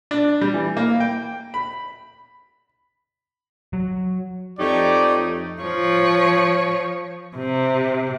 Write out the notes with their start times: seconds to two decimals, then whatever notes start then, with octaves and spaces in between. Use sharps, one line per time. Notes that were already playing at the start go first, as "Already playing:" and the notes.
0.11 D4
0.41 G3
0.54 E3
0.77 A#3
1.00 G5
1.54 B5
3.73 F#3
4.59 F2 A3 D#4 G4 C#5 D5
5.62 F3 C#5
7.36 C3